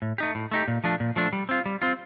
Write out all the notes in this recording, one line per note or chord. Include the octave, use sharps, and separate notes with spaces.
A2
A3 D#4 G4
A2
A3 D#4 G4
A#2
F3 A3 D4
A#2
F3 A3 D4
G3
C4 F4
G3
C4 F4